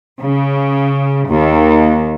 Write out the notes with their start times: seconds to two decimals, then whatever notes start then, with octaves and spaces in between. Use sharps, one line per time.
0.20 C#3
1.26 D#2